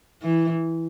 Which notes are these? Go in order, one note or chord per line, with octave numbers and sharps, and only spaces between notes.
E3